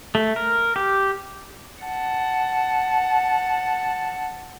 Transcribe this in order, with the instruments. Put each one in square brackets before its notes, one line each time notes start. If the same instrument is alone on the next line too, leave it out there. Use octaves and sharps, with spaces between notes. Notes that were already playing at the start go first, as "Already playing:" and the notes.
[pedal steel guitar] A3
A#4
G4
[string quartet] F#5 A5